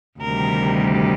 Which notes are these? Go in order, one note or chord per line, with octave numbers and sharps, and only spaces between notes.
D2 C3 D#3 G3 A#4